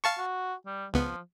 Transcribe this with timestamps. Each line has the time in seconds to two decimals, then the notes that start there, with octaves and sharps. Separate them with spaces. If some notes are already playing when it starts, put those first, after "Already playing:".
0.04 F5 A5 C#6
0.19 F#4
0.66 G3
0.94 C#2 F3 B3